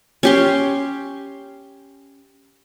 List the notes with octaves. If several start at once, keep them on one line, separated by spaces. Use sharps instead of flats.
C#4 G4 C6